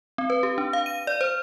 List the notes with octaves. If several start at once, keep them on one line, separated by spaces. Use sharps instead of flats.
C4
B4
G4
D4
F5
D#7
D5
C5